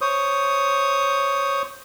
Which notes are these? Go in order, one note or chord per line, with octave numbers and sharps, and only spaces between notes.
C5 C#5 D#6